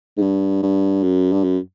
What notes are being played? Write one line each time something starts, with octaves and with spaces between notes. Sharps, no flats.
G#2
G2
G2
F#2
G2
F#2